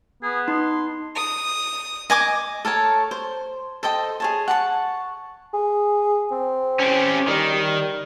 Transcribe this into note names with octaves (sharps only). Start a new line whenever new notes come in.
B3 G#4
D#4 C6
D#6
D#5 G#5 D6
A4 A#4 C#5 A5
C5
A4 C5 D#5 G5
G#4 C#5 A5
F#5 A5 C#6
G#4
C4
C#4 G4
D#3 G3
G3